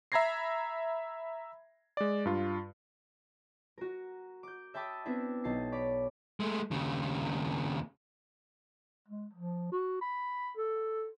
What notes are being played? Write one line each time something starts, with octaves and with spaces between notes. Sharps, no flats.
E5 A#5 B5 G#6 A#6 C7
G#3 D5
G2 F4
F#4 A#4
D6 G6
E5 G5 A5 B5 D6 D#6
B3 C4 D4 E4 E5
B1 D#4 A5 C7
C#5 D5 B5 D6
G#3 A3
D#2 C#3
G#3
F3
F#4
B5
A4